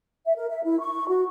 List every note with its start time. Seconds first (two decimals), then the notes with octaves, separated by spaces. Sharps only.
0.25 E5
0.37 A#4
0.50 E5
0.63 E4
0.79 C#6
1.07 F#4